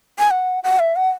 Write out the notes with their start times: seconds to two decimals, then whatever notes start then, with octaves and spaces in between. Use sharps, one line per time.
0.19 G#5
0.31 F#5
0.64 F#5
0.79 E5
0.96 F#5